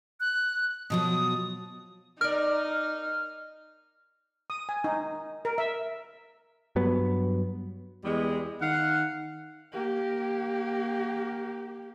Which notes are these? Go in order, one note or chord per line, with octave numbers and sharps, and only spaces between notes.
F#6
B2 F3 F#3 D#6
D#4 A#4 D5 F6
D#6
G#5
D#4
A#4
E5
G2 F#3 B3
E2 E3 G3 G#3
D#3 F5 F#5
A#3 G4